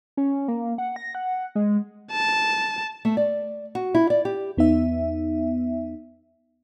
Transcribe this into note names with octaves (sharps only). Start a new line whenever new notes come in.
C#4
A#3
F#5
A#6
F#5
G#3
A5
A3
D5
F#4
E4
D5
G4
E2 B3 D#4 E5